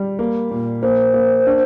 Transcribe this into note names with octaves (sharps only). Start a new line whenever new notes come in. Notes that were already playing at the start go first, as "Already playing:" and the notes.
Already playing: G3
A#3
A#2
A#3 C5
A#3
D4